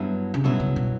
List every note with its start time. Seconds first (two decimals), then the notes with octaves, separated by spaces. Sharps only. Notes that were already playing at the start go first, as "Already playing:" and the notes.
Already playing: G2 F#3 B3 E4
0.34 C#3
0.43 G2 B2 F#3 B3 E4
0.60 C#3
0.76 B2